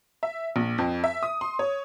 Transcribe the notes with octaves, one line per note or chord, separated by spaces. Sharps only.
E5
A#1
F2
E5
D#6
C6
C#5